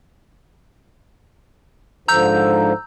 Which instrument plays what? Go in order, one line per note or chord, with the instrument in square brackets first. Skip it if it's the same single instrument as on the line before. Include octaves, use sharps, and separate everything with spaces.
[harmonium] G#2 D3 F3 [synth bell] A#5 E6 G6